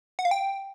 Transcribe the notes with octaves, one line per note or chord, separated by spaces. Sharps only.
F#5
F5
G5